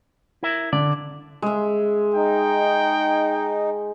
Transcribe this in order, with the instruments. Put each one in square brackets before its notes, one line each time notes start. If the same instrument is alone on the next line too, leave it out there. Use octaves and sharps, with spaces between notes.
[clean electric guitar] E4 A#4 E5
[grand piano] D3 [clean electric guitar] D5
[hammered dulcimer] G#3 E5
[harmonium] D#4 [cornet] G5